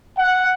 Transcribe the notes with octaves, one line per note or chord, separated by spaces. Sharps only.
F#5